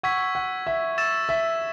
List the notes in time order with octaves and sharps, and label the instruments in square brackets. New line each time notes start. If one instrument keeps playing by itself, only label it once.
[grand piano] F#5 [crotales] C#6 E6 G#6 B6
[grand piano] F#5
E5
[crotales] C#6 E6 A6 E7
[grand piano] E5